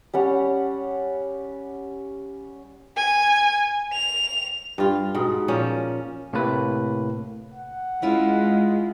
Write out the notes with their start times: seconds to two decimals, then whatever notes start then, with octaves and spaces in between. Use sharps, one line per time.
0.13 G3 C#4 F#5
2.97 G#5
3.93 F7
4.78 G2 F4
5.15 G#2 B2
5.48 A#2 F3 C#4
6.33 A2 C3 A#3 B4
7.53 F#5
8.02 G#3 C#4 E4 F4